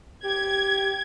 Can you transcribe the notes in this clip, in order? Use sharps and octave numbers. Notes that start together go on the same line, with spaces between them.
G4 G#6